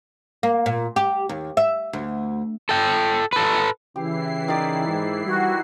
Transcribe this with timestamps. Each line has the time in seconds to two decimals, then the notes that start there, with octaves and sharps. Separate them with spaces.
0.43 A#3
0.66 A#2
0.96 G4
1.29 D#2
1.57 E5
1.93 D2
2.69 A4 G5
3.33 A4 B4
3.96 C#3 E3 E4 G4 C7
4.48 D#3 G4 D5
4.87 G#2
5.26 G3 F#4